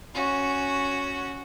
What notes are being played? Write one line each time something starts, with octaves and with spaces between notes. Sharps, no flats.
C#4 F#4